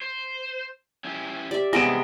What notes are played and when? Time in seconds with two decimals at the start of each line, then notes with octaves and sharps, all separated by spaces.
0.01 C5
1.04 C#4 E4 G4
1.51 G4 D5 E5
1.73 G2 C3 E3 G#3 B3 A#6 D7 E7